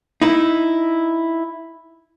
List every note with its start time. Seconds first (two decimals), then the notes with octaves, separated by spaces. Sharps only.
0.22 D#4 E4